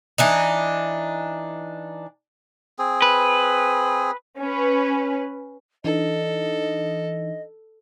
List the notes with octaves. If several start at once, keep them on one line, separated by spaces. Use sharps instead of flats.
E3 D4 D#4
C4 G#4
B4
C#4 B4
E3 D4 D#4 A4 D#5